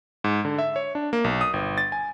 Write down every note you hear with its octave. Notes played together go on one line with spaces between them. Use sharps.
G#2
D3
E5
C#5
D4
A#3
B1
D#6
G1
A6
G#5